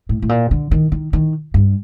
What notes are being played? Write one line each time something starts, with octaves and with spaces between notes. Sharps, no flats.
A2
A2
A#2
D3
D#3
D#3
D#3
G2